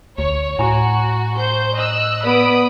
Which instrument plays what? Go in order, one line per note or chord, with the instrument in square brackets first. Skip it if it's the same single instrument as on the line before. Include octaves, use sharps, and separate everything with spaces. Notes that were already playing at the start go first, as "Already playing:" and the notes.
[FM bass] D2 [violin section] C#5
[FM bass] A2 [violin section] F#4 [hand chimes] G#5 A#5 C#6
[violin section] C5 G6
D#5 E6 F#6
[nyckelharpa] B3 [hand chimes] D5 [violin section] B5 D#6 D7